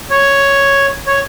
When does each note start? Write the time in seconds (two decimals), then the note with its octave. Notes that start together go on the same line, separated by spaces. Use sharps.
0.10 C#5
1.07 C#5